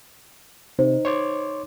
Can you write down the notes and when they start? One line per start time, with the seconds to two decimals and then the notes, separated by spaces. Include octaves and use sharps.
0.79 C3 D#4 C5
1.05 C#5 C6 D6